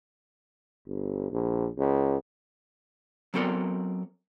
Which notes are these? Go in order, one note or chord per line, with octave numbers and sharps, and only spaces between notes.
G1
A#1
C#2
F#3 B3 C4 A4 A#4 D5